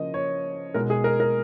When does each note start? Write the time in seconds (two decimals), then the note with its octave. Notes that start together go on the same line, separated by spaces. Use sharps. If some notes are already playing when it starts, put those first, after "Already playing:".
Already playing: C#3 F3 A#3 D#5
0.14 C#5
0.74 B2 G#3 D#4 A#4
0.90 G#4
1.04 A#4
1.20 A#4